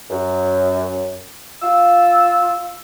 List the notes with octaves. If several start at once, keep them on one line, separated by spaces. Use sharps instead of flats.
F#2
F4 E6